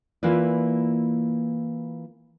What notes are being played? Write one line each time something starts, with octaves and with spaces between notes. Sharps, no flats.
E3 A#3 E4 F4 B4 D5